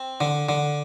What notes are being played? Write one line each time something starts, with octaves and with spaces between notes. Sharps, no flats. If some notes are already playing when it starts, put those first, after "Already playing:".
Already playing: C4
D3
D3